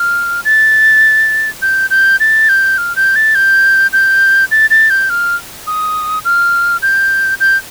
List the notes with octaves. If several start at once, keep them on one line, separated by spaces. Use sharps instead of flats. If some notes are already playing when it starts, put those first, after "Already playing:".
Already playing: F6
A6
G6
G6
A6
G6
F6
G6
A6
G6
G6
A6
A6
G6
F6
D#6
F6
G6
G6